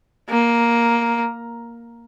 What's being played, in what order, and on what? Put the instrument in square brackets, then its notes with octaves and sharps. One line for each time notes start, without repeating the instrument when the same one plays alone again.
[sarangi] A#3